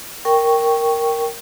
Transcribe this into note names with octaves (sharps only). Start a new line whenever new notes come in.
A#4 G5 C#6